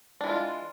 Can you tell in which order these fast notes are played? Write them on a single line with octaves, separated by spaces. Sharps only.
D4 E3 G#3 F4